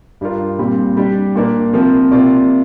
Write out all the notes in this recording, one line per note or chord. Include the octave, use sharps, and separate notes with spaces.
G2 G3 D4 F4 A#4
A#2 G3 C4
G3 D4 G4
A#2 A#3 D4 A#4 D5
C3 F3 C4 F4 A#4
C3 A#3 F4 D5